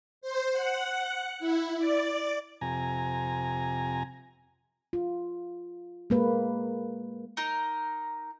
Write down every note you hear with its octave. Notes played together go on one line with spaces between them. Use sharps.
C5
F#5
E4
D5
F2 C3 G#5 A#5
F4
G#3 A#3 B4
D#4 A#4